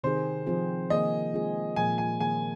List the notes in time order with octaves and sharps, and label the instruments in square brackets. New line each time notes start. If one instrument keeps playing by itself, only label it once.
[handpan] C3 D#3 C4 D#4 G#4 [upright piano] C5
[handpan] F3 C4 F4 G#4
[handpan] D#3 A#3 G#4 [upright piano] D#5
[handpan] G#3 C4 F4 G#4
[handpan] A#2 F3 A#3 G#4 [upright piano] G#5
[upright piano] G#5
[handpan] D#3 A#3 G#4 [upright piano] G#5